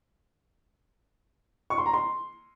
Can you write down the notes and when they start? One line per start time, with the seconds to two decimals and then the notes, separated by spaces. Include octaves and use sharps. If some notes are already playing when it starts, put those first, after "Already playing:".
1.70 C#6
1.78 C6
1.86 A#5
1.94 C6